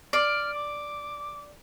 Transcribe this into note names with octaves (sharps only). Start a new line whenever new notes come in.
D5 F6
D6